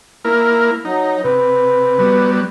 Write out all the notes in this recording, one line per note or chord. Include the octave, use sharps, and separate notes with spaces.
A#3 E4 A#4
F#3 D#4
C3 B4
F#3 G3 B3